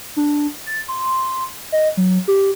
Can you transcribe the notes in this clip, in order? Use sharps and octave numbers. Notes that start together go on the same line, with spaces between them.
D4
A6
C6
D#5
F#3
G4